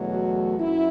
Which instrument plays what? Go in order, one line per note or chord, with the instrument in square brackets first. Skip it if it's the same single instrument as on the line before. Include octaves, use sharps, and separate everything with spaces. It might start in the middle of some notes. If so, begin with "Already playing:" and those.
Already playing: [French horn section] E2 B2 F#3 A3
F#4
F#2 E4